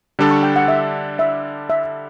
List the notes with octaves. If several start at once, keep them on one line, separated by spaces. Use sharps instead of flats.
D3 G3 D4 A4
C#6
G5
F#5
E5
E5
E5